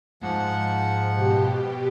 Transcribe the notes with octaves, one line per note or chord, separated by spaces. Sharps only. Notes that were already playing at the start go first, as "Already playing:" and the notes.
G#2 F3 F#5
B2 G4